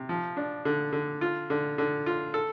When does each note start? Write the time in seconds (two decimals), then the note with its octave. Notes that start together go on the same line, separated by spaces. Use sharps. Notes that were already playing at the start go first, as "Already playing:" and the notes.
Already playing: C3
0.09 F3
0.37 D4
0.65 D3
0.92 D3
1.21 F4
1.50 D3
1.78 D3
2.06 F4
2.34 A4